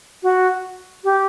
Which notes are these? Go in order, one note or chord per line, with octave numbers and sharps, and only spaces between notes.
F#4
G4